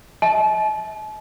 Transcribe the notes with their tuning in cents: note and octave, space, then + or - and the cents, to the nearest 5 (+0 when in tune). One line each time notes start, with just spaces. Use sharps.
D#5 +45 A5 -45